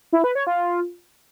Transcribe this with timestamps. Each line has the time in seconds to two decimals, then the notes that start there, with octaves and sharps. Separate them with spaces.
0.13 E4
0.24 B4
0.35 C#5
0.47 F4